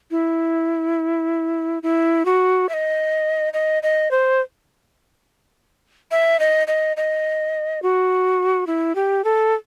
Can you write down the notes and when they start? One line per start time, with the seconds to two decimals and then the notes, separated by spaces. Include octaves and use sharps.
0.11 E4
1.83 E4
2.25 F#4
2.69 E5
2.74 D#5
3.53 D#5
3.83 D#5
4.11 C5
6.11 E5
6.40 D#5
6.67 D#5
6.97 D#5
7.82 F#4
8.67 E4
8.95 G4
9.24 A4